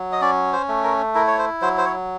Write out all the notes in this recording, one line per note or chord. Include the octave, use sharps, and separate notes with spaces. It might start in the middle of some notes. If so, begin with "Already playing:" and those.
Already playing: F#3
D#5
C#4 D5
C5
A3
A#4
E4 A#4
C#5
C5
F#3 C5
C5
C#5